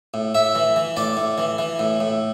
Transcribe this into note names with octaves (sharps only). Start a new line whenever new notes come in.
A2
A2 E5
E3
E3
A2 D5
A2
E3
E3
A2
A2